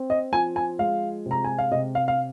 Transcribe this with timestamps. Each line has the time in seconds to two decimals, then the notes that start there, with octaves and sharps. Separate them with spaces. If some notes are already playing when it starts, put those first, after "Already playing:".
Already playing: C4
0.10 D#5
0.32 F3 G#5
0.56 G#5
0.79 G#3 F5
1.26 C3
1.31 A#5
1.44 G#5
1.58 F5
1.72 C3 D#5
1.95 F5
2.08 F5